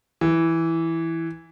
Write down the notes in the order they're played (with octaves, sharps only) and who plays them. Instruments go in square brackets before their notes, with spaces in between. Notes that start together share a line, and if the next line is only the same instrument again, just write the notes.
[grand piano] E3